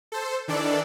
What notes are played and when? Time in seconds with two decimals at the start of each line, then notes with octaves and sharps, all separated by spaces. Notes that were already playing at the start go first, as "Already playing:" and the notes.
0.12 A4 C5
0.48 D#3 E3 D4 A4 D5